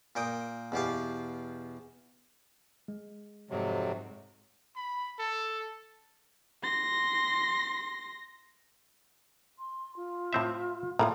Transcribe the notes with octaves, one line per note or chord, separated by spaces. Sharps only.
A#2 A#4 G5 D#6
E2 B2 G4 F5
G#3
F2 G#2 C3 F#3
B5
A4
C6 A#6
C6
F4
A2 C4 E5
A2 A#3 F4 A#4 A#5